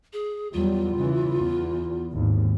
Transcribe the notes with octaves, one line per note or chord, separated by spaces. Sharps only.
G#4
E2 F#3 G3 F4
C#3 E3
E2
G#1 D#2 G#2